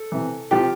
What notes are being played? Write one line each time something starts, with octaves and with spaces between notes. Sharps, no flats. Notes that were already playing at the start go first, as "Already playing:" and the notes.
Already playing: A4
C3 E3
C3 F3 G4